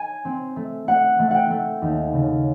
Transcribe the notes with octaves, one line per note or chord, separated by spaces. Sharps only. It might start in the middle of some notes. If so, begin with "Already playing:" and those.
Already playing: G#5
C4
A3
A3 F#5
A3
F#5 G5
A3
D#2
C#3